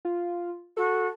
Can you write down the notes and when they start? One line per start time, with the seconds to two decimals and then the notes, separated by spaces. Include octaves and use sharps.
0.05 F4
0.77 F#4 A4